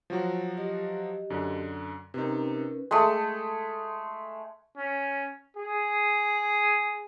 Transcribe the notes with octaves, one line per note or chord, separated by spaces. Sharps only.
F3 F#3 F#4
G4 D#5
F#2 D3
C3 C#4 D#4 A#4 B4
G#3 A3
C#4
G#4